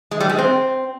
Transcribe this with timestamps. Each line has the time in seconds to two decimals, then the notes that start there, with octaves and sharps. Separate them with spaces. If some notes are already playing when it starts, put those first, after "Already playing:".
0.11 G#3
0.20 G3
0.29 G#3
0.38 C4